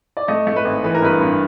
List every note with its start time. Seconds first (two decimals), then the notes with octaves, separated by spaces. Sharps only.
0.17 D5
0.28 A3 D#5
0.47 A3
0.56 B4
0.65 G#1
0.84 E3 B4
0.95 A#4
1.02 G2 B4
1.21 G2